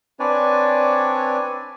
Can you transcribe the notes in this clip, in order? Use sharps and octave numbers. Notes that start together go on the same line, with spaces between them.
C4 D4 B4 C#5 D5 G#5